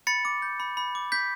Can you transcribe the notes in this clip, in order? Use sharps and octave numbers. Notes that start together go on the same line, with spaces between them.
B5 A6 C#7
D6
G6
B5
B5
D6
G6 B6